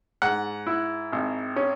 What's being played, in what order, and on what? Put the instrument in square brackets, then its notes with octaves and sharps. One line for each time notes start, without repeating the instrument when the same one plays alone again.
[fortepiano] G#2 F#5
E4
G#1
C#4